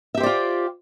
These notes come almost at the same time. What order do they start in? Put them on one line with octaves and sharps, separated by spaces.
E5 G4 C5 D5 F4